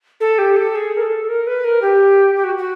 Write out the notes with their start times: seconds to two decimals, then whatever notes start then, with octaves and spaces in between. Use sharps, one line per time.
0.20 A4
0.38 G4
0.56 A4
0.75 G#4
0.97 A#4
1.02 A4
1.29 A#4
1.47 B4
1.64 A#4
1.82 G4
2.36 G4
2.44 F#4
2.58 F#4